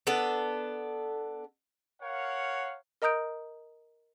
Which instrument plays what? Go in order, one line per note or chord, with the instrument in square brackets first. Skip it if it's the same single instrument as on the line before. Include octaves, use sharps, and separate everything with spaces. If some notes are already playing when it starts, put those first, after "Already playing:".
[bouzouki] B3 D4 A4
[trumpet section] A#4 C#5 F5 F#5
[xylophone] A#4 D#5 A#5 D#6 G6 D7